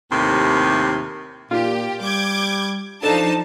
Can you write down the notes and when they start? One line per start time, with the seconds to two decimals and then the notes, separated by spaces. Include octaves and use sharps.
0.10 D#2 A2 C3
1.51 A#2 F4 G4
2.01 G3 D6 G6 G#6
3.03 F3 D4 D#4 A4 A5